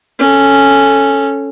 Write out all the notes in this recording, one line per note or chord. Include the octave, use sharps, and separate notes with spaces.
C#4 A4